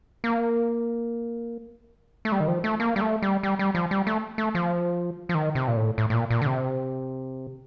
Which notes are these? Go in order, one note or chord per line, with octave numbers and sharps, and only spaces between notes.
A#3
A3
G3
D#3
F3
A3
A#3
G3
A3
G3
G3
G3
F3
G3
A3
A3
F3
F3
D#3
C3
A#2
A2
A2
A2
A#2
A#2
D3
C3